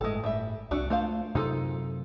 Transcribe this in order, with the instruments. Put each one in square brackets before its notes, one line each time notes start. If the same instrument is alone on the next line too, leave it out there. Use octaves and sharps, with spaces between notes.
[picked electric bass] G1 A2 [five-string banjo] G#3 A4
[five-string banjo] G3 E5
[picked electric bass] C2 [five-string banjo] A3 D4 F#4
[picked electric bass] A3 [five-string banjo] F4 C5 F5
[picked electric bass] F#2 C3 [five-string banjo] D#4 F4 A4